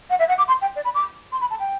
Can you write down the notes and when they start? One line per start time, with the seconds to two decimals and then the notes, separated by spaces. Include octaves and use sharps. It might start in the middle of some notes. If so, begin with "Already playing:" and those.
0.09 F#5
0.19 E5
0.28 F#5
0.37 D6
0.48 C6
0.61 G5
0.75 D5
0.84 B5
0.94 D6
1.32 C6
1.40 B5
1.50 A5
1.59 G5